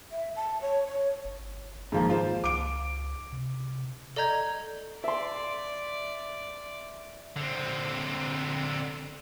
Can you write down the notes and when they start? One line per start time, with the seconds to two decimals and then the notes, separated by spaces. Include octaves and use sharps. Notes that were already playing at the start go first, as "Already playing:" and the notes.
0.12 E5
0.36 A5
0.62 C#5
0.87 C#5
1.25 G1
1.92 G#2 D#3 F3 A#3
2.10 F4 C5
2.44 C#2 D6 D7
3.33 C3
4.16 A4 D5 D#5 A#5 G6 G#6
5.04 D5 E5 C6
7.36 D3 C4